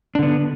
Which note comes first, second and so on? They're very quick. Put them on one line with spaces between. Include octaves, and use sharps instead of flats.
D4 D3 B3